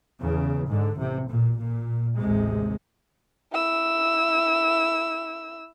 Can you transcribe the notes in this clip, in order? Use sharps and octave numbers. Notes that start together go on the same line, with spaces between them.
E2 C#3
G#2 D3
A1 C3
A#2
A#2
A1 D#2 C3 G#3
E4 E6